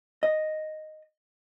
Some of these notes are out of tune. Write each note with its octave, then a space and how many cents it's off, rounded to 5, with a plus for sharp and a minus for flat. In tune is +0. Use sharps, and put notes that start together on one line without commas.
D#5 -5